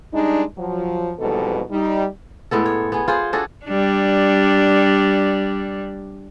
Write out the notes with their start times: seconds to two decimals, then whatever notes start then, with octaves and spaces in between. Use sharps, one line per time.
0.13 G3 G#3 D4 D#4
0.58 F3 F#3
1.19 F2 G#2 B2 E3 G3 A4
1.71 G3 D#4
2.51 A2 G#3 B3 A4
2.66 C#5
2.92 B3 G#4
3.08 F4 G#4 C5 F#5
3.33 D4 F#4 G#4 A4
3.65 G3 D4